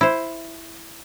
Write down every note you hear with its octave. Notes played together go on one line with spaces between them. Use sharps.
E4 C5